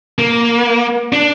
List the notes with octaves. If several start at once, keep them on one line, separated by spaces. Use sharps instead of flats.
A#3
D4